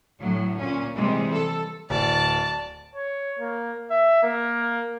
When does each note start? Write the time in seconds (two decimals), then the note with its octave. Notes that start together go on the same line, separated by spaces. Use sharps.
0.20 D2 A2 F#3
0.60 A#2 C#4
0.96 C3 E3 G3 G#3
1.34 A4
1.90 D1 D5 A5
2.95 C#5
3.39 A#3
3.90 E5
4.23 A#3